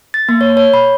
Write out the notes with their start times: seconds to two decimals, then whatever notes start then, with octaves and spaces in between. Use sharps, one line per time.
0.14 A6
0.29 A#3
0.41 C#5
0.57 C#5
0.74 B5